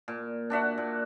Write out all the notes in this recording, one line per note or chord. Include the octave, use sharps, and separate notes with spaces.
A#2
D4 F#4 E5 F#5
A#2